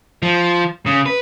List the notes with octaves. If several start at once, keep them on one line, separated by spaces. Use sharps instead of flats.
F3
C#3
B4